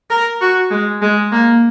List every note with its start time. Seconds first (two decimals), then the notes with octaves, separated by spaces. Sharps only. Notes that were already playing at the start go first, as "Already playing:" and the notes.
0.10 A#4
0.41 F#4
0.71 G#3
1.02 G#3
1.32 A#3